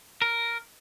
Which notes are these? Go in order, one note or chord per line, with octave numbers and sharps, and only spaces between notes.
A#4